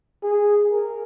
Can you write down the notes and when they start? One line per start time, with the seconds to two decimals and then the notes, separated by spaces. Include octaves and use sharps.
0.23 G#4
0.71 A#4